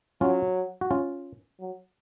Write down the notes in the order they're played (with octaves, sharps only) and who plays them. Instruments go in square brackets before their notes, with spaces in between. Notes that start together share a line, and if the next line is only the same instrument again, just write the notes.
[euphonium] F#3 [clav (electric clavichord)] C#4 F4
[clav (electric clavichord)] F#4
C#4 F4
[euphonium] F#3